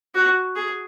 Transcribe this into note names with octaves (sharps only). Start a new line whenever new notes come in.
F#4
G#4